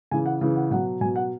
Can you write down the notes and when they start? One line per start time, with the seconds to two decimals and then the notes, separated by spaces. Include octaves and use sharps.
0.11 C#3 E3 G#5
0.26 F#5
0.41 C#3 E3
0.56 F#5
0.71 B2 F#3 F#5
1.01 B2 G#5
1.04 F#3
1.16 F#5